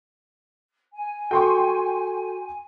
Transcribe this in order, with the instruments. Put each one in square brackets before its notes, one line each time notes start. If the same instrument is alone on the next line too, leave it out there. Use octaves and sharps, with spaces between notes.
[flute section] G#5
[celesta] F#4 A4 [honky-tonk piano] G5 C6 C#6